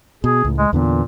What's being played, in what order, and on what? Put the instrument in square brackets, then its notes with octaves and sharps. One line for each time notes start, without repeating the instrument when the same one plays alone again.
[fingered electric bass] B2 [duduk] G#4
[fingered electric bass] C#2 A2
[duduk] G#3
[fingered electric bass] E2 D3 B3 [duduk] A#2